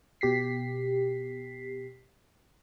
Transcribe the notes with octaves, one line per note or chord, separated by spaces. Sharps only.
B2 G4 B6 C7